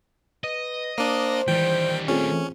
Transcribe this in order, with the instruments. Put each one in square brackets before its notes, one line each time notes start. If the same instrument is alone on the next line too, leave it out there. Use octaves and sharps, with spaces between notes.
[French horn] B4 [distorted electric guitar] D#5
[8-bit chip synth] A#3 D4 [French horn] C5
[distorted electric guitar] D#2 G3 [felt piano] E3 [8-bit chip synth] G5
[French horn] A3 [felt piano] C4 F4 G#4 [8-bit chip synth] C#4